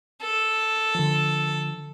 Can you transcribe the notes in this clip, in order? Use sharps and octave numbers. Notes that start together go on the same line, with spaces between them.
A4
D3 F3